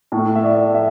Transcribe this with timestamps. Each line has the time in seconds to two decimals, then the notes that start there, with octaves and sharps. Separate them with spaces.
0.12 A2
0.17 A3
0.35 E5
0.44 D5
0.74 E5